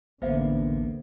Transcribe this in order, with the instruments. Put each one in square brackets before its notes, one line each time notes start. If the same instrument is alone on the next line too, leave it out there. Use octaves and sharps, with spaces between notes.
[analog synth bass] A1 [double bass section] D2 D3 [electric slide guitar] A#3 B3 [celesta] C5 E5 F5